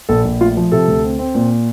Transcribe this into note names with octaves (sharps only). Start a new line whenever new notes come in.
A#1 A4
A#1
A3 F4
F3
C3 A4
D2
C4
C4
A#2